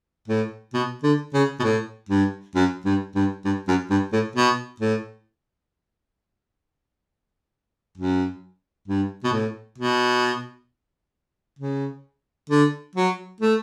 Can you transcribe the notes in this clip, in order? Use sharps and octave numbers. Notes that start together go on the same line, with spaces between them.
A2
B2
D3
C#3
B2
A2
G2
F#2
G2
G2
G2
F#2
G2
A2
B2
A2
F#2
G2
B2
A2
B2
C#3
D3
F#3
A3